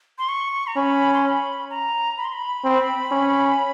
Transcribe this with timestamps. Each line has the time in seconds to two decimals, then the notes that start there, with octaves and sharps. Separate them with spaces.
0.18 C6
0.29 C#6
0.67 A#5
0.76 C#4 B5
1.14 C6
1.23 B5
1.70 A#5
2.18 B5
2.25 C6
2.33 B5
2.64 C4
3.12 C#4